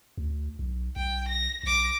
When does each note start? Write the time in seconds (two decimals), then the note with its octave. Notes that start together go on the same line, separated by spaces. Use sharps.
0.18 D2
0.59 B1
0.96 B1 G5
1.29 A#6
1.63 B1 D6 A#6